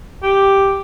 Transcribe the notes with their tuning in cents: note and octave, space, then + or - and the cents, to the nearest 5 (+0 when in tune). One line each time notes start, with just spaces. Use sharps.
G4 +0